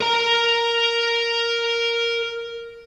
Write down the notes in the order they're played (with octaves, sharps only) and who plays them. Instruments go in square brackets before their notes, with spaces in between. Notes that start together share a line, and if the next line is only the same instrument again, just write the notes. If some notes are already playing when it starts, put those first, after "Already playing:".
[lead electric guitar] A#4 A#5